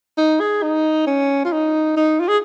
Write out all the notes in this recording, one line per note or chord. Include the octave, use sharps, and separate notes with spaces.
D#4
G#4
D#4
C#4
F4
D#4
D#4
F4
G#4